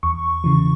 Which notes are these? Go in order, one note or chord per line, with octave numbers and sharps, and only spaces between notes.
E2 C#6
C#3 E3